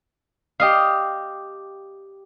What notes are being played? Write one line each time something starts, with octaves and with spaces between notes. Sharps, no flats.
G4 D#5 F5